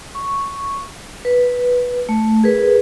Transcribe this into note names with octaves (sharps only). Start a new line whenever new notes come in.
C#6
B4
A3
G#4 A#4 B4